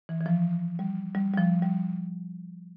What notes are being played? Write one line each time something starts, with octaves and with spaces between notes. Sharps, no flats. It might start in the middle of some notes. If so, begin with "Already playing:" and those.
E3
E3
F3
G3
G3
G3
F3
G3